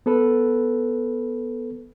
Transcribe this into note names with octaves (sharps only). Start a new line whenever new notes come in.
B3 A4 B4